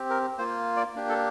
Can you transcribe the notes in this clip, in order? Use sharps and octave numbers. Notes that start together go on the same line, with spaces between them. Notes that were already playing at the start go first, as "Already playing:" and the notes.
Already playing: C4 G4
A#4
A#3 F4 C5
D5
A#3 D4 G4
A4